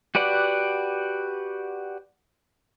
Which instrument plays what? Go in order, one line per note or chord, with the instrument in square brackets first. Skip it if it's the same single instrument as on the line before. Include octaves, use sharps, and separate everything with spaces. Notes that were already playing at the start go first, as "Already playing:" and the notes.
[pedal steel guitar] F#4 G4 B4 D5 F#5